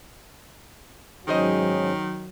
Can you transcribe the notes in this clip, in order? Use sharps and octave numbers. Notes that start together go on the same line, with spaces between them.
G#2 D#3 F#3 C#4 G#4 C5 D#5